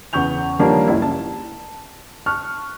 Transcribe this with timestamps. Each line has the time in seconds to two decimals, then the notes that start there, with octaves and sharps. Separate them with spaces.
0.13 E2 C#3 C#6 G6 F7
0.59 D#3 F3 G3 A#3 C#4 D4
0.87 F#1 C#2 E4
1.02 A5
2.26 A5 C#6 F6 F#6